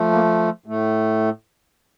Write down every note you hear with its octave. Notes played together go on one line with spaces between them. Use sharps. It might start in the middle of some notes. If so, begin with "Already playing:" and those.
Already playing: F3 A3
A#3
A2 A3